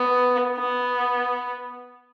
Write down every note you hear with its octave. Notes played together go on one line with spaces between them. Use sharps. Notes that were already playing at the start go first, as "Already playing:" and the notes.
Already playing: B3
B3